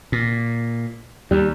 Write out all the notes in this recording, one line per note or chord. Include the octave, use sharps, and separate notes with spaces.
A#2
D#2 G3